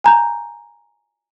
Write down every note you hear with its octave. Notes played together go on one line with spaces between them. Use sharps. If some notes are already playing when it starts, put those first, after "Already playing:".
G#5 A#5 G6